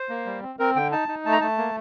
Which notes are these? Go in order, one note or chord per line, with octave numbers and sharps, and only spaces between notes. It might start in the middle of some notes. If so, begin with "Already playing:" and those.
Already playing: C5
A#3
G3
C4
C4 A#4
D3 G5
D#4 A5
D#4
A3 A5
A#5
A3 A5
A#3